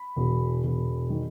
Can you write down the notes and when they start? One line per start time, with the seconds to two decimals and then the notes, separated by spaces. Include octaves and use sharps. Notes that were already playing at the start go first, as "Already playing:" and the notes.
Already playing: B5
0.16 E1
0.64 E1
1.10 D#3